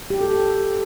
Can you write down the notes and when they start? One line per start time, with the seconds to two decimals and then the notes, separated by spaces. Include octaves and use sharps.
0.10 G4
0.21 A4
0.31 A4